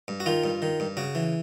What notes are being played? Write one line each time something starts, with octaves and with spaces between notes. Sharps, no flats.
G2
F#4
D#3 F4
G2
D#3
G2
C#3 F#4
E3